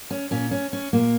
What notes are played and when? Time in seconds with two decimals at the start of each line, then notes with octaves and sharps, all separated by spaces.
0.11 C#4
0.31 A#2 C#4
0.51 C#4
0.73 C#4
0.93 A#2 A#3